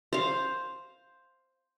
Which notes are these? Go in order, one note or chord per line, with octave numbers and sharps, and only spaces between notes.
C5 F5